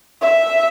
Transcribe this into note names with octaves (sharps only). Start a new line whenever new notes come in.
E5